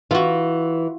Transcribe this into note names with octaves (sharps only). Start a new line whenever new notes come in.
E3 F4 F#4